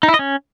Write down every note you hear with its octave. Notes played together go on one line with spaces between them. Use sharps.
D#4
E4
D#5
C#4